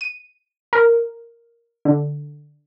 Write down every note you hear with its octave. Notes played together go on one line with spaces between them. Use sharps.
D#7
A#4
D3